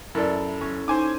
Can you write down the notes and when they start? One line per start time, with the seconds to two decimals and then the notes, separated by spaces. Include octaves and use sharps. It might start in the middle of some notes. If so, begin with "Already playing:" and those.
0.15 F#2 E4 A4 A#4 D5
0.61 C#4
0.88 D#4 C5 G#5 D6